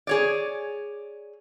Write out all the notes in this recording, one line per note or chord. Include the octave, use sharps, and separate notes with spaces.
G#4 C#5 D5